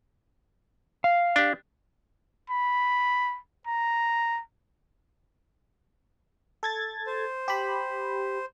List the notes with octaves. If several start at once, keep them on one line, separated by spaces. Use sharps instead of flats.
F5
D4 G4
B5
A#5
A4 G#6 A6
C5
G4 B5